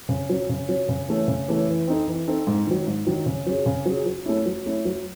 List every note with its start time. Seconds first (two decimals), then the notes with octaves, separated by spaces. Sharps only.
0.09 C#3
0.29 F#3 C#4
0.49 C#3
0.69 F#3 C#4
0.89 C#3
1.08 E3 A3 C#4
1.28 C#3
1.48 E3 A3 C#4
1.68 E3
1.88 C4 D#4 A4
2.08 E3
2.27 C4 D#4 A4
2.47 G#2
2.67 D#3 F#3
2.87 G#2
3.07 D#3 F#3
3.26 C#3
3.46 F#3 C#4 G#4
3.66 C#3
3.86 F#3 C#4 G#4
4.06 F#3
4.26 A3 C#4 E4
4.46 F#3
4.66 A3 C#4 E4
4.85 F#3